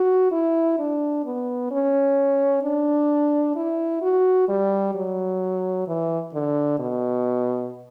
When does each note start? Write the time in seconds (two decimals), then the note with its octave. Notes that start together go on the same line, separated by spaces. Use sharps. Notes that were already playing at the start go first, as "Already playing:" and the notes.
Already playing: F#4
0.32 E4
0.79 D4
1.25 B3
1.71 C#4
2.63 D4
3.56 E4
4.02 F#4
4.49 G3
4.95 F#3
5.87 E3
6.34 D3
6.79 B2